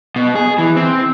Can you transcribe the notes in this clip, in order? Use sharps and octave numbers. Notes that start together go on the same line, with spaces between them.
B2
G#4
E3
C4